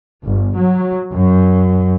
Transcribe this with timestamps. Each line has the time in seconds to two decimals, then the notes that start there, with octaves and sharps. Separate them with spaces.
0.23 G1
0.56 F#3
1.13 F#2